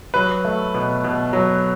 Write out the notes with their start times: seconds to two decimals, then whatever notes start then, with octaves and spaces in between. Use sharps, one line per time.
0.14 F#3 B4
0.45 A3
0.74 B2
1.04 B2
1.33 F#3